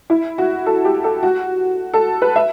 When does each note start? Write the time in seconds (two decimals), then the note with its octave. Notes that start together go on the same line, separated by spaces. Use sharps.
0.10 E4
0.38 F#4
0.66 A4
0.85 G4
1.04 A4
1.23 F#4
1.94 A4
2.22 B4
2.36 E5